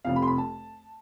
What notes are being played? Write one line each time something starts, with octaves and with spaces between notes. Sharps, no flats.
F1 F2 C3 F5
B5
C6
B5
A5